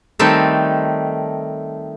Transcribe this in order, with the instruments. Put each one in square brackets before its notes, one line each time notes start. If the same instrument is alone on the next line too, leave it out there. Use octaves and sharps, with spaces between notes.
[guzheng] D#3 G3 A3 C4 D#4 A4